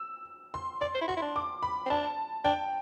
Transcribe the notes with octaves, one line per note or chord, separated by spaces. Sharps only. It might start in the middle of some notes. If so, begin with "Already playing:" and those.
Already playing: E6
C6
D5 C6
C5
E4
F#4 C6
E4
D4
D6
B5
C4
D4 A5
D4 G5